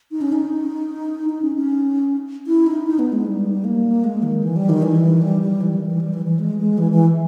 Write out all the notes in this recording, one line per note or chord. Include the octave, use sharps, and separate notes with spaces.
D#4
C#4
D#4
D#4
C#4
C#4
E4
D#4
D#4
B3
G#3
G3
A#3
G#3
D#3
E3
G3
D#3
E3
G3
G3
E3
D#3
E3
G3
E3
E3
G#3
G#3
E3
E3